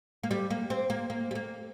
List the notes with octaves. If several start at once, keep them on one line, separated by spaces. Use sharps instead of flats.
A#3
G3
A#3
C4
A#3
A#3
G3
A#3